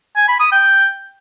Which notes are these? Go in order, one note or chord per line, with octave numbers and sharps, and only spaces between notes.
G#5
B5
D#6
G5